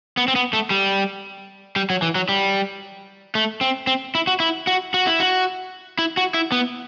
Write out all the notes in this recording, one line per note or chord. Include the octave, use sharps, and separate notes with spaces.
B3
C4
B3
A3
G3
G3
F#3
E3
F#3
G3
A3
C4
C4
E4
F#4
E4
F#4
F#4
E4
F#4
E4
F#4
E4
B3